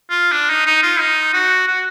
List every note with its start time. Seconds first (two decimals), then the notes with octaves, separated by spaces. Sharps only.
0.10 F4
0.32 D4
0.50 D#4
0.67 D#4
0.83 F4
1.00 D#4
1.34 F#4
1.67 F#4